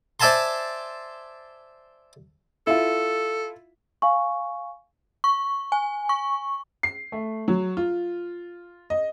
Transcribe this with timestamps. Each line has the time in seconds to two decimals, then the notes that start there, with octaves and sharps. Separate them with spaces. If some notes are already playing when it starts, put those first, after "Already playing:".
0.20 C5 D5 E5 G#5 A5 C6
2.67 E4 F4 A4
4.02 F5 G#5 C#6
5.24 C#6
5.72 G#5
6.09 C#6
6.83 C7
7.12 A3
7.48 F#3
7.77 F4
8.90 D#5